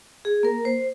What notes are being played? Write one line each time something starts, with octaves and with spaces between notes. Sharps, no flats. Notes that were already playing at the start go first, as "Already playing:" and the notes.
G#4
A#3 A#4
C5